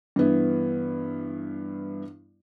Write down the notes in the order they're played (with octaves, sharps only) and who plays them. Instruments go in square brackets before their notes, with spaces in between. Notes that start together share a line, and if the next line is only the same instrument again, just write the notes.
[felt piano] G2 E3 B3 E4